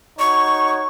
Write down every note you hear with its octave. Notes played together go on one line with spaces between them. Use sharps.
D#4 F#4 C#5 C#6